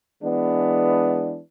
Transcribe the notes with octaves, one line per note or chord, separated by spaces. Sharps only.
E3 G#3 B3 D4